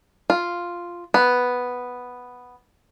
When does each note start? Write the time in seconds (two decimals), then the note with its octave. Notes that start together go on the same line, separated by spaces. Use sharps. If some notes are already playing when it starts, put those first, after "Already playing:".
0.30 F4
1.14 B3